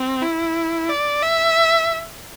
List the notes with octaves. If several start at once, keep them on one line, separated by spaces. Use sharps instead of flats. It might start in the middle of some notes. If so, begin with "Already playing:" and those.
Already playing: C4
E4
D5
E5